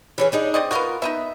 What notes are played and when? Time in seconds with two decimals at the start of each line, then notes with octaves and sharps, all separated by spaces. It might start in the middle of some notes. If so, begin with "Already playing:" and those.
0.18 E3 C#4 G#4
0.32 D4 D#4 G#4
0.54 C4 D5 D#5
0.71 B3 F4 F#4 A#4 F5
1.02 B3 D#4 D#5 E5